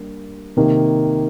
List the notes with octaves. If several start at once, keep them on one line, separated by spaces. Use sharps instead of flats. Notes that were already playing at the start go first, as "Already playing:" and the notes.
Already playing: G3 A#3 D4
C3 D#3 A#3